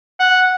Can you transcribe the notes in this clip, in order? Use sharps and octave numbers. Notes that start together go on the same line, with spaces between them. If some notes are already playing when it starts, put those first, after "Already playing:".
F#5